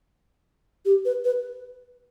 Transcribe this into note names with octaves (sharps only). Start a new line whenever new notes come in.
G4
B4
B4